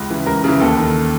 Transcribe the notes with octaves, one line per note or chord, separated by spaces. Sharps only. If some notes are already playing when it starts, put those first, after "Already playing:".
Already playing: C#2
C#3 E3
C#2 A#4
C#3 E3
D#2 A4
D#3